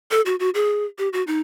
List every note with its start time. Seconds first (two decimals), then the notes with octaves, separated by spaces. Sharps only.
0.11 A4
0.26 F#4
0.40 F#4
0.54 G#4
0.98 G4
1.13 F#4
1.27 D#4